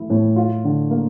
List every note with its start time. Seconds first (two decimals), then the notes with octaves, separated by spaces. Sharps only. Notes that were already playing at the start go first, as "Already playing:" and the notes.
Already playing: E3 A3 E4
0.10 A2
0.36 F4
0.64 D3
0.90 A#3